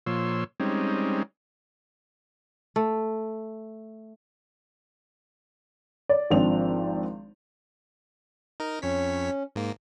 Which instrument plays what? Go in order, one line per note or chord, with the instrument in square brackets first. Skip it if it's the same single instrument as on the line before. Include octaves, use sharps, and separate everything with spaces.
[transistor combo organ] A#2 F3 C#5 C6 E6
G3 G#3 C4 C#4 D#4
[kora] A3
[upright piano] D5
G#1 F3 C4 D4 F7
[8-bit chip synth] D#4 A#4
[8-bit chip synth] F2 C#5 B6 [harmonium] C#4
[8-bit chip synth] G#2 A#3